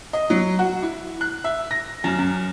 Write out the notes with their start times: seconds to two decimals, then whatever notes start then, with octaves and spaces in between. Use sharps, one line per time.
0.13 D#5
0.30 F#3
0.59 F#4
0.82 E4
1.21 F#6
1.44 E5
1.71 A#6
2.04 F#2
2.19 F#2